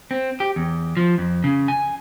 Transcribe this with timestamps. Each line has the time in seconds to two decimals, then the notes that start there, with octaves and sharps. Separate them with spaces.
0.11 C4
0.40 G4
0.56 E2
0.97 F3
1.18 F2
1.44 C#3
1.68 G#5